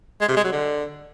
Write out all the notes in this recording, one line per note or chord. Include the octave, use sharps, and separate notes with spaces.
G#3
C3
G#3
F#3
D3